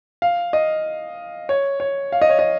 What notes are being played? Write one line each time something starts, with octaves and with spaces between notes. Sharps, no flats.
F5
D#5
C#5
C#5
F5
D#5
C#5
D#5